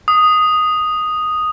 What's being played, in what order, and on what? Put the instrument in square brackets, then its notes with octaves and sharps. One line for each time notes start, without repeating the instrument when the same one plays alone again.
[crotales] D#6